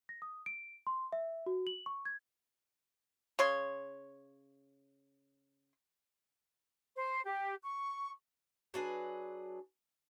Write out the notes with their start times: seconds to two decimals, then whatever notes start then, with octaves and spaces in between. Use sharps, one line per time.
0.09 A#6
0.22 D#6
0.46 D7
0.87 C6
1.12 E5
1.46 F#4
1.67 F#7
1.86 C#6
2.05 G#6
3.39 C#3 C#5 C6
6.96 C5
7.25 G4
7.63 C#6
8.74 F#3 D4 G#4 B4